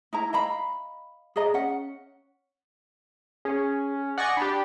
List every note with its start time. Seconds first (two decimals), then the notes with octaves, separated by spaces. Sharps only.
0.13 D#4 E4 A#5
0.33 D#5 F5 A#5 B5
1.36 G#4 D5 D#5 A#5
1.54 C#4 F#5
3.45 C#4 G#4
4.18 D5 D#5 F#5 G#5 C#6
4.37 D4 G4 B5